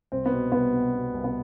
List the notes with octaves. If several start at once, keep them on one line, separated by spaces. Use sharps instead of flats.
C2 C4
B3
B2
C2 B3
B2
B2
C2
B3